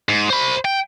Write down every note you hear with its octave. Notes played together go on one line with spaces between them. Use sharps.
G#2
C5 B5
G5